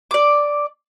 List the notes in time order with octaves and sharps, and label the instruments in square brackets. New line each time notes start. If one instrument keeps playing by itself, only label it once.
[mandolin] D5 D6